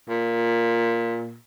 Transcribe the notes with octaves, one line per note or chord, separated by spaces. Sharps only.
A#2